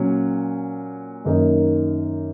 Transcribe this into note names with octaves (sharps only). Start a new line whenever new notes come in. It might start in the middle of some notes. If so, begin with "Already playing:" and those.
Already playing: A#2 F#3 C#4
F#2 D#3 A#3 D#4 A#4